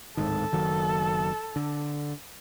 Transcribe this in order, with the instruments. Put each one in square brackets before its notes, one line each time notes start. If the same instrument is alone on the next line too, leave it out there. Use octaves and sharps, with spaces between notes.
[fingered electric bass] D1 G#2 D#3 [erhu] A4
[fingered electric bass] F#1 D#3 F#3
D3